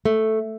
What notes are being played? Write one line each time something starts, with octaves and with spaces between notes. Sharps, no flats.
A3